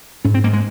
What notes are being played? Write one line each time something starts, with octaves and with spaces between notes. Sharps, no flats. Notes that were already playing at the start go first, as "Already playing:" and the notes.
G#2 C#4
C4
G#2 A#3
G#3